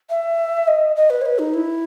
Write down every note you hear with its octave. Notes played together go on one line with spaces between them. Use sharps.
E5
D#5
D#5
B4
C#5
B4
D#4
E4